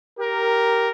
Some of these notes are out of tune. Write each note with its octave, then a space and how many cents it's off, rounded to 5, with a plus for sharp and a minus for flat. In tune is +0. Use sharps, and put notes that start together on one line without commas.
G4 -10 A#4 +0